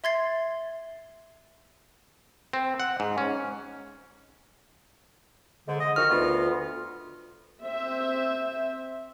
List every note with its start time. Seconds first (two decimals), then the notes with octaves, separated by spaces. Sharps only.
0.04 E5 C6 G#6 A6 C7
2.53 C4
2.80 F#5
3.00 G#2
3.18 C#4
5.68 G#2 D3
5.80 D#5
5.96 D#3 F3 F#4 F6
6.11 D2 B3 F4
7.63 C4 C5 E5